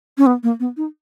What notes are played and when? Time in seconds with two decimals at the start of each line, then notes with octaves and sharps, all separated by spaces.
0.18 C#4
0.26 B3
0.43 A#3
0.60 B3
0.77 D#4